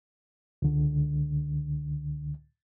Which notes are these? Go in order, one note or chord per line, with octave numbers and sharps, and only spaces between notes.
C#2 D3